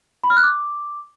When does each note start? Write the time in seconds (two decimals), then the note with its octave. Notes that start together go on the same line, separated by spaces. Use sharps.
0.24 B5
0.30 F6
0.37 F#6
0.43 D6